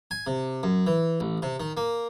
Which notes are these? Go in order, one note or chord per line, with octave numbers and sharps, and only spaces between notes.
G#5
C3
F#2
E3
A1
C3
D#3
A#3